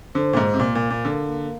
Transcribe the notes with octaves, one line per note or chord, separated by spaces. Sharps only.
D3 C5
A#2
G#2 F4
C3
A#2 A#4
A#2
F5
A#2
D3 A#4
A#3